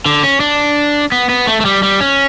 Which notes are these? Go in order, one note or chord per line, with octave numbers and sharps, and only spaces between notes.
D3
C#4
D4
B3
B3
A3
A3
G3
G3
C#4